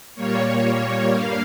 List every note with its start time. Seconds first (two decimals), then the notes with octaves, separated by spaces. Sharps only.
0.15 A#2 G3 A#3 C#5
1.10 G2 G3 A#3 F5